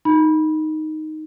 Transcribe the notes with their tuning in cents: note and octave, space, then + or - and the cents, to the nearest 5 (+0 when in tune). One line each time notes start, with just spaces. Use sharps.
D#4 +0 B5 -15